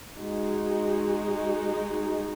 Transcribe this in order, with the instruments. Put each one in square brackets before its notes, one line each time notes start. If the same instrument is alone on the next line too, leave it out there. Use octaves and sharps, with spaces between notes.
[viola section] G#3 D#4 F#4